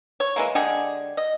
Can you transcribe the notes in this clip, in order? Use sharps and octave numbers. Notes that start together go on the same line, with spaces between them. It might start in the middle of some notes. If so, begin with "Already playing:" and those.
C#5
E3 G#3 A#3
D3 G#3 G4 G#4
D#5